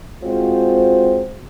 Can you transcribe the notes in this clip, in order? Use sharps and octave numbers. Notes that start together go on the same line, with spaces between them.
G#3 C4 F4 F#4 C5